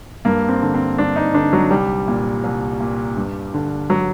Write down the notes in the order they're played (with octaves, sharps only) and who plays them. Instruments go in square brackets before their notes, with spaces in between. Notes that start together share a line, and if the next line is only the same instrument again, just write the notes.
[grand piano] G2 A#3
C4
D3
C4
G2 D4
D#4
D3 D4
F#3
C2 G3
A#2
C2
A#2
G2
D3
F#3